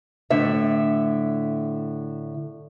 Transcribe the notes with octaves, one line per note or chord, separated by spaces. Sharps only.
A2 D3 E5